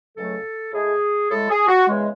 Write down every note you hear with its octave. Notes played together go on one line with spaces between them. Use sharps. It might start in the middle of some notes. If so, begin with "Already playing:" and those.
C#2 C#3 F#3 A3 A4
A2 G#3 G#4
A2 G#3 A4
G#4
F#4
E2 C#3 G#3